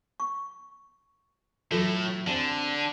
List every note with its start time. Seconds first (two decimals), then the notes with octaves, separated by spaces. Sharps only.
0.20 C#6
1.71 A2 E3 F#3 A3 F4 A4
2.27 D3 C4 D4 G#4